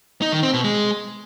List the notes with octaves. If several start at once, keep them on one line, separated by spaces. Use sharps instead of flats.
D#4
D#3
C4
B2
G#3